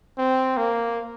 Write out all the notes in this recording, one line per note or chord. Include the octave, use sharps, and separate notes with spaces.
C4
A#3